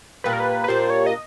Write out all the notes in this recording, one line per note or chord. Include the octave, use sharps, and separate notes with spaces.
A#2 G3 A#3 D4 B4
A#4
B4
B4
A#2 G3 A#3 D4 C5
C#5
D#5